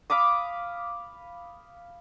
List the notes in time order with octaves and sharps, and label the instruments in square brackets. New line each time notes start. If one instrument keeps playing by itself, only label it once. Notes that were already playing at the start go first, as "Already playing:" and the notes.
[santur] F5 B5 D6 D#6